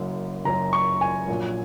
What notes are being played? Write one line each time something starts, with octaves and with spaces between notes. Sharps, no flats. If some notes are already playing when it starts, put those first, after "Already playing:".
Already playing: F#1 F#2 F#3
F#1 F#2 F#3 A#5
C#6
G#5
A#1 A#2 F#3